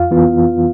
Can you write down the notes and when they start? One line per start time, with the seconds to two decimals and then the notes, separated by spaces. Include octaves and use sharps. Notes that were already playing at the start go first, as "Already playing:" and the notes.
Already playing: F2 F4 F5
0.11 E3 B3 F4